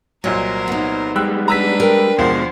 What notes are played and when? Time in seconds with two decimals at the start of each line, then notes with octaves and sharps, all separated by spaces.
0.24 C2 A#2 F#3 A#4 C5 D#5
0.68 B3 D#4
1.16 G3 G#3 G5 E6 F#6
1.48 D4 B4 A#5 E6 B6
1.80 A#4 G5
2.18 D#2 B2 F3 G#3 C5 F#5